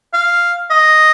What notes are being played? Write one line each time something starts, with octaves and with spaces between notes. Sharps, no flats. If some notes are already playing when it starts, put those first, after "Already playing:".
F5
D#5